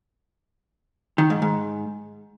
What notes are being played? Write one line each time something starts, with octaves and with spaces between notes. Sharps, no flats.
D#3
G#2
G#2